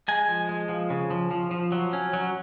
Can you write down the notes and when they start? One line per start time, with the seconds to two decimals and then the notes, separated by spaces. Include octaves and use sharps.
0.08 G#3 G#5
0.28 F3
0.49 G#3
0.69 F3
0.90 C#3
1.11 F3
1.31 F3
1.51 F3
1.72 F#3
1.93 C#4
2.13 F#3